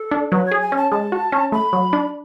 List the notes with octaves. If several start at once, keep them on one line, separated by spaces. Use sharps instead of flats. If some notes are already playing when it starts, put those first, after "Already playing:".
Already playing: A4
D4
F#3 B4
C#5
G#4
G#5
C#4
A5
G#3 A5
F#4
C#4
A3 B5
F#3
D4